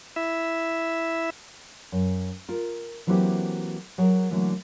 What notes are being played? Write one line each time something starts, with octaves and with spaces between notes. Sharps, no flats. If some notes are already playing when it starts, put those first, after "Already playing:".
E4 E5
F#2
F4 A#4
E3 F#3 A#3 C4 E4 G4
F#3 G#4 A#4
D3 E3 F#3 A3 A#3